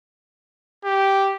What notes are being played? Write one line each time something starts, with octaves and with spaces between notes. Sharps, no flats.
G4